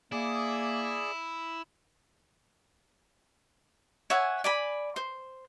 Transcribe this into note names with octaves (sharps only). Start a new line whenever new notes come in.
A#3 E4 G#4 D5 D#6
C#5 E5 F#5 G#5
D5 G#5 B5
C5